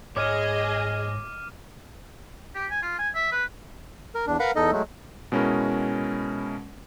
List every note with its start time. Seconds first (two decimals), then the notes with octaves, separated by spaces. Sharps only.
0.16 G#2 G#4 C#5 D#5 G#5 D6 F6 D#7
2.55 G4
2.71 G#5
2.83 F4
2.99 G#5
3.15 E5
3.32 B4
4.15 A#4
4.27 E2 D4
4.39 A#4 B4 F5 F#5 A#5 B5
4.56 E2 D#4 A4 D#5
4.72 F#3 G#3 A3
5.32 B2 G#3 C#4 E4 A#4